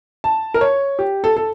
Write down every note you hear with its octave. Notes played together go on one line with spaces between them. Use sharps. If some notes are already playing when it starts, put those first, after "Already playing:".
A5
A#4
C#5
G4
A4
A4